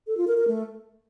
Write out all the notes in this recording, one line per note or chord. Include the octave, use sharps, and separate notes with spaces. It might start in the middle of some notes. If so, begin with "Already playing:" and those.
A4
F4
A#4
A#4
A3